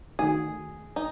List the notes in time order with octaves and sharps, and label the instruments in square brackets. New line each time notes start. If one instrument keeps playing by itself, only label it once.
[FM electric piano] D#3 A3 D#4 F#4 [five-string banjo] G#4
[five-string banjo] D#4